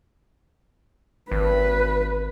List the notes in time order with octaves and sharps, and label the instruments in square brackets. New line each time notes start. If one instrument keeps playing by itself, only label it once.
[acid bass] G#1 [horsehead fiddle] B4